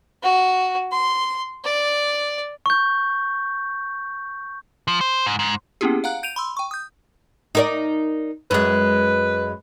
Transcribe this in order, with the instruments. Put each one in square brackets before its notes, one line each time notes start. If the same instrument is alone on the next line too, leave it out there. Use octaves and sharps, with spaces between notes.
[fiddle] F#4
C6
D5
[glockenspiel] C#6 G6
[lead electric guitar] F3
C5
G#2
G#2
[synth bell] A#3 B3 C#4 E4 G4 G#4
F5 F#5 A#5 F#6
G6 D7 D#7 F7
B5 C6 E6
G5 C#6
D#6 G6
[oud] D#4 A#4 D5
[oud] F#2 G#3 [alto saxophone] B4